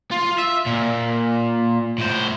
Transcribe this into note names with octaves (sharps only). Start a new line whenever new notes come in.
F4
E5
A#2
A2 C5